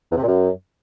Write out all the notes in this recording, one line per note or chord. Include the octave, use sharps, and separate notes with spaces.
E2
C3
A#2
F#2